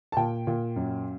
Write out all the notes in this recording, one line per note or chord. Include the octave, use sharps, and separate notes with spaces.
A5
A#2 G5
A#2
F#2